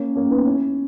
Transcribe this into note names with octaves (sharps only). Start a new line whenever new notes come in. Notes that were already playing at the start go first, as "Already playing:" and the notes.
Already playing: A#3 C#4
A#3 C#4
B3 D#4
C#4 E4